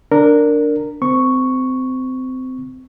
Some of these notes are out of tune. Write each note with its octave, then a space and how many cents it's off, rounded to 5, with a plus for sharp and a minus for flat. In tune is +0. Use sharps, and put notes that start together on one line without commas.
D4 +0 A#4 -15
C4 -25 C#6 +0